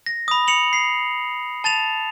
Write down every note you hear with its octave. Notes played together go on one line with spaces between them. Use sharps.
A#6
B5 D#6
C#7 F7 F#7
C7
A5 A6 E7 F7